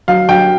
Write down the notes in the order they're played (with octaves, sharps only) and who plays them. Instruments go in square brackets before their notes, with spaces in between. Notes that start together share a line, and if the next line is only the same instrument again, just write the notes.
[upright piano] F#3 F5
F#3 G5